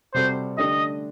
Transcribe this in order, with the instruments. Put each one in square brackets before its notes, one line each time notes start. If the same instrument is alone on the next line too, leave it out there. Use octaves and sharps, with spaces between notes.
[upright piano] C3 G3 C4 F#4 A4 [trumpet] C5
[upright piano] D3 A3 D4 G4 [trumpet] D#5